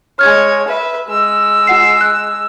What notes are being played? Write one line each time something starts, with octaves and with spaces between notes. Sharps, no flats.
G#3 C#5 F6 G#6
B4 E5
G#3 E6
F4 F#5 C7
F#6